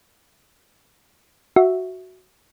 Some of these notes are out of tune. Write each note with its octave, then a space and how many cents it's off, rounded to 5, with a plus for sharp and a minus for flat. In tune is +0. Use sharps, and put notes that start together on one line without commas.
F#4 +0 E5 +0